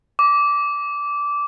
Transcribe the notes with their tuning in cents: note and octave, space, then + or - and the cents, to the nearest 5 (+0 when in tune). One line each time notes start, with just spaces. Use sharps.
D6 -15